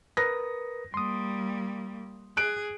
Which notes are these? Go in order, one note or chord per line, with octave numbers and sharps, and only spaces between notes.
A#4 B4 D#6 A#6
G3 A#3 C6 D#6
G#4 F#6 D7